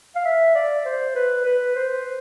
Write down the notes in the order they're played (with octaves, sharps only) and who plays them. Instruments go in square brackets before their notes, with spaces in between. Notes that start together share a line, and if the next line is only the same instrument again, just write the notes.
[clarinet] F5
E5
D5
C5
B4
B4
C5